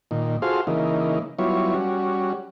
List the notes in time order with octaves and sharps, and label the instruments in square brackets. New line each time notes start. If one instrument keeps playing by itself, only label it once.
[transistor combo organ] A#2 D#3
F4 F#4 G#4 A4 C5 F5
C#3 E3 A#3 D#4
F#3 G3 B3 E4 F4 C#5
G3 C#4 F#4